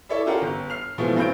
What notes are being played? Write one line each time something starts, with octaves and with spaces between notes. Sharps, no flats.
E4 A4 C#5 D5 E5
C#4 F4 G4 A4 A#4 F#5
G1
F6 C7 F7
B2 E3 F3 G#3 A3
G2 C3 C4 C#4 G6 D7